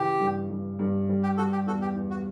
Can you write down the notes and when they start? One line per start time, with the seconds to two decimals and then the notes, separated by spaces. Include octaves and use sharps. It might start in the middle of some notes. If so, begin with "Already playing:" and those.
Already playing: C#3 E3 G4
0.20 G2
0.50 G2
0.79 G2
1.09 G3
1.23 G4
1.37 G3 F#4 A4
1.52 G4
1.66 E2 F#4 A4
1.81 G4
1.96 E2
2.10 F#4